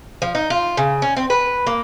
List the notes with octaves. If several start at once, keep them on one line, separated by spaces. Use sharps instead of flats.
F3
D#4
F4
C#3
C#4
C4
B4
A#3